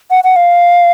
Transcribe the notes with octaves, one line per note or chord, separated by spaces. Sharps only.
F#5
F#5
F5